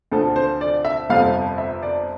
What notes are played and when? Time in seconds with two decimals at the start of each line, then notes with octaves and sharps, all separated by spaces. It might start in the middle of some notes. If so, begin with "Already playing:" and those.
0.12 D2 D3 F3 A4
0.36 C5
0.61 D5
0.85 E5
1.10 G1 F2 C3 F3 F5
1.58 E5
1.83 D5